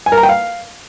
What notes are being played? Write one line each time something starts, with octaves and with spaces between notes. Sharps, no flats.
G#5
A#4
A#5
G5
F5